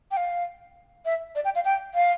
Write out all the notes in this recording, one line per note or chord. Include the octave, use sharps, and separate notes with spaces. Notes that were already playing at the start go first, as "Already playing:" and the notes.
G5
F5
E5
D5
G5
F5
G5
F5